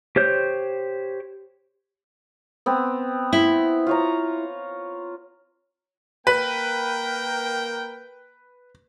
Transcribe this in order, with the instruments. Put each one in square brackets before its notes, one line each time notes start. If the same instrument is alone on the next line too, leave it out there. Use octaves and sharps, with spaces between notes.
[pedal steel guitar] G4 C5 C#5 G6
[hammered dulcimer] B3 C4
[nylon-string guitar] E4
[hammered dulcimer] F4 C#5 A#5
[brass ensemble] A#3 A#4 G5 [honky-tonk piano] B4